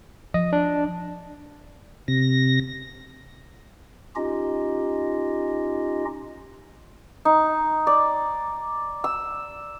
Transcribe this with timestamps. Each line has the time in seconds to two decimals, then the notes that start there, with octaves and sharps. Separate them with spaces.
0.34 F3 D#5
0.53 D4
2.08 C3 A#6
4.16 C#4 D#4 F4 G4 D#5
7.25 D#4
7.87 D5
9.04 E6